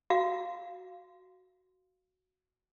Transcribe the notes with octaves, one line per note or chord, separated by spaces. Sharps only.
F#4 F5